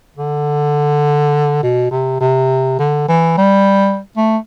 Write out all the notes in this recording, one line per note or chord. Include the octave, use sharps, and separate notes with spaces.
D3
B2
C3
C3
D3
E3
G3
A3